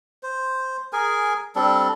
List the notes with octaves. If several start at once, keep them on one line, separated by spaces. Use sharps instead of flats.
C5
G#4 A#4 G#5
G3 C4 D4 A4